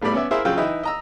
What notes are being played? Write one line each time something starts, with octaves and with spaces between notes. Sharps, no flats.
G#1 A2 G3 B3 D5 B5
B3 C#4 D5 E5
E4 G#4 A#4 C5 E5 F5
A#1 C#3 F#3 F4 G5 E6
E3 D#4 E4 G5
D#5 A#5 E6